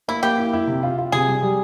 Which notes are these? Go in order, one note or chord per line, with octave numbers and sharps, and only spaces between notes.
A#3 E4
A#3 G4
E4
E4
C3
F4
F4
C3 G#4
G3
G3